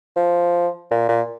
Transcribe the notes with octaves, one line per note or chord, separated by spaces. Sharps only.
F3
A#2
A#2